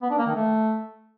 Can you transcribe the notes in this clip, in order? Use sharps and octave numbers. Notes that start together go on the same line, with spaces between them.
B3
D4
A#3
D#3
A3